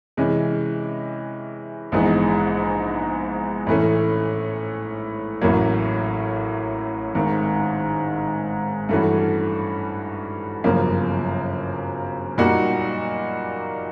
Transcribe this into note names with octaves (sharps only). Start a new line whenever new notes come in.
C3 E3 G#3 C#4
A#1 G#2 E3 G#3 B3
A2 E3 A3 C#4
A1 A2 F#3 A#3
G#1 G#2 D#3
G2 E3 A3 C#4 F#4
G1 F#2 C#3 F3 A#3
A#2 G3 A#3 D#4 F#4